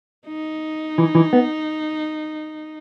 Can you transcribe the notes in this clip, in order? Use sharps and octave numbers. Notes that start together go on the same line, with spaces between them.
D#4
E3
E3
B3